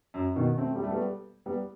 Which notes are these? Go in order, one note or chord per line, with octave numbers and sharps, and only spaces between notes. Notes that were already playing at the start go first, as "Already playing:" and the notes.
F#2
B2 D#3
A3 C4
G3
A3
G3 B3
G3 B3